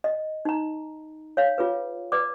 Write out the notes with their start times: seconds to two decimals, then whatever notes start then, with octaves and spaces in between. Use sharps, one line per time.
0.04 D#5
0.45 D#4 A#5
1.37 C#5 F5
1.58 F4 G#4 B4
2.12 B4 D5 D6